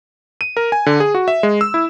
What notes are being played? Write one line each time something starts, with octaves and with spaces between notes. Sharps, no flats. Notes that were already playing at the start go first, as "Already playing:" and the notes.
D#7
A#4
G#5
D3
G#4
F#4
E5
G#3
E6
E4